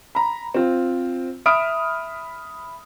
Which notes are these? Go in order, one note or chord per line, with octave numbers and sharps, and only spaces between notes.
A#5 B5
C4 F4
E5 B5 D#6 F6 D7